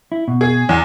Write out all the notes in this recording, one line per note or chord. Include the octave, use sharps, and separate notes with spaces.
E4
B2
G#4
E2